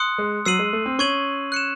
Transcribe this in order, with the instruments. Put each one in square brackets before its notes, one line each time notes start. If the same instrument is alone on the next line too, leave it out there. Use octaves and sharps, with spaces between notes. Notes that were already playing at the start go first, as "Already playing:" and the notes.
Already playing: [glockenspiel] C6 D#6 F#6 C#7
[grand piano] G#3
[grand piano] F#3 [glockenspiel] E6 C7 D#7 F#7
[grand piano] G#3
A3
C4
[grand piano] C#4 [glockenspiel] C#6 G#6 D#7 F#7
[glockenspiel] F#6 C#7 E7